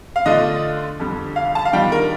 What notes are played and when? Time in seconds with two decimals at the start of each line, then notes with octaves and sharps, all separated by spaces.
0.16 F5
0.26 D3 A3 D4 F4 D#5
1.00 F2 D3 G3
1.36 F5
1.55 A5
1.65 F5
1.73 D#3 G3 D4 F4 G5
1.92 A#4